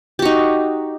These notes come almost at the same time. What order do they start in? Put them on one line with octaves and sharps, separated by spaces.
G4 F#4 D#4